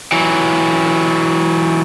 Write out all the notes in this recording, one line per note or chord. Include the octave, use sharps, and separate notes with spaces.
E3 F#3